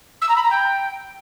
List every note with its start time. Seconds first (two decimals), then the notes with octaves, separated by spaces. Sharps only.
0.21 E6
0.28 A#5
0.36 B5
0.43 A#5
0.50 G5